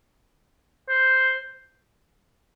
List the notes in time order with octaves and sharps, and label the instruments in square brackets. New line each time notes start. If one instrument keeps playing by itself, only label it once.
[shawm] C5